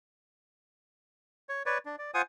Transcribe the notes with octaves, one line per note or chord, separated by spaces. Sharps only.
C#5
B4 C#5 D5
D4
D5
F4 C5 F#5 G#5 D#6